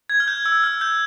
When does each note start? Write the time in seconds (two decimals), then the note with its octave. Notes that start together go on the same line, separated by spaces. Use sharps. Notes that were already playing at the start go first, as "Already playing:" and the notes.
0.10 G#6
0.20 F6
0.28 G6
0.46 E6
0.63 F6
0.81 G6